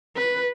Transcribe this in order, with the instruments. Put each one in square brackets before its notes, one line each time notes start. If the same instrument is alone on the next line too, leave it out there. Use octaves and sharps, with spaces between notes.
[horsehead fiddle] B4